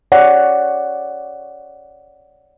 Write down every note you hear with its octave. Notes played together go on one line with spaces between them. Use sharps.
C#5 D5 F#5